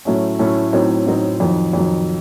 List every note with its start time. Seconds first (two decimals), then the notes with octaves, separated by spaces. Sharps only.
0.05 A2 F#3 A3 C#4
0.39 A2 F#3 A3 C#4
0.73 A2 F#3 C4 D#4
1.06 A2 F#3 C4 D#4
1.40 F2 D#3 F#3
1.73 F2 D#3 F#3